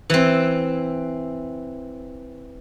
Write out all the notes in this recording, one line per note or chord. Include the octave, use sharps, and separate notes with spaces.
E3 C4